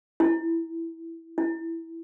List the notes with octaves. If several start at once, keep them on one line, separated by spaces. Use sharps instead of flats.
E4
E4